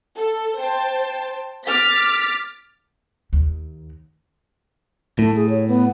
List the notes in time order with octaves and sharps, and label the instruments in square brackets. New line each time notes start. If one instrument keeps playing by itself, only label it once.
[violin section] A4
C5 G5 A5
D6 F6 A6 B6
[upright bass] D#2
[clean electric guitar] A2 [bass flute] A3
[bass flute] G#4
C#5
B3